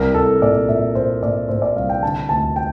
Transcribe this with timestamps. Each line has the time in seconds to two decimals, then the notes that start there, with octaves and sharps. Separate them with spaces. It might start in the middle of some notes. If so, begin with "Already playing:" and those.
Already playing: C2 A#4
0.15 C2 A4
0.42 A#2 D5
0.68 A#2 E5
0.95 A#2 C5
1.23 A#2 D5
1.49 A#2 C5
1.62 D5
1.76 C2 F5
1.89 G5
2.02 D3 A5
2.29 D2 A5
2.56 G5